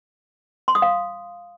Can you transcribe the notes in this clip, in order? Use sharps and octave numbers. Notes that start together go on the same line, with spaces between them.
C6
D#6
F5